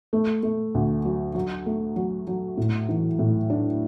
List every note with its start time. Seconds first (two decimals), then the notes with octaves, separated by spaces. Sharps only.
0.13 A3
0.43 A3
0.74 D2
1.05 F#3
1.35 F#3
1.66 A3
1.96 F#3
2.27 F#3
2.57 A2
2.89 E3
3.19 A2
3.50 D4